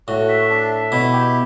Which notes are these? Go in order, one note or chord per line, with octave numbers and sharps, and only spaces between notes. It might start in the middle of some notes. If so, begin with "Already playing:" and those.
A2 F#4
E5
D4
E5
B2 E4
G4